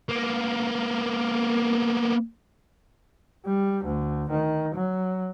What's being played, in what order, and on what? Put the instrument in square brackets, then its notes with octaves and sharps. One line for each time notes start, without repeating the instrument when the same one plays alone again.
[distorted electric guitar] A#3 B3
[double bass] G3
D2
D#3
F#3